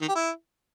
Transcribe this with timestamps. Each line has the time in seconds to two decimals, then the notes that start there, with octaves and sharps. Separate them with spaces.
0.01 D#3
0.08 G4
0.15 E4